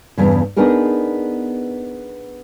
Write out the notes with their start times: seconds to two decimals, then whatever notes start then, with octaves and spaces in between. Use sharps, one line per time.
0.18 E2 G2 C#3
0.57 B3 D4 D#4 G#4 A#4 B4